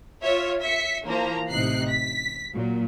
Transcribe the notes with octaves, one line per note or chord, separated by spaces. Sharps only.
F4 C#5 E5
E5 B6 C#7
E3 F3 A#3 A#5
A1 C3 D#4 F#6 C7
B6
A#2 F#3